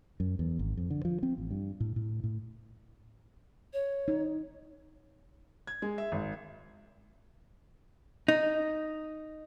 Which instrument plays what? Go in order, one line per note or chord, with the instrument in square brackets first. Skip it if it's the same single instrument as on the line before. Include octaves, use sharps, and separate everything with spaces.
[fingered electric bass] F#2
E2
G#1
F2
D3
F3
C4
A1
G2
A2
A2
A2
[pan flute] C#5
[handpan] D#4
[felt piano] G#6
G#3
E5
G#1
[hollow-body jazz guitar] D#4